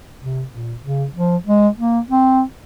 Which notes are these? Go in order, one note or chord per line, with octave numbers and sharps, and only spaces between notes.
C3
A#2
C#3
F3
G#3
A#3
C4